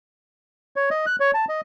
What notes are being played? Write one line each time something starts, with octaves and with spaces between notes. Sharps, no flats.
C#5
D#5
F#6
C#5
A5
D#5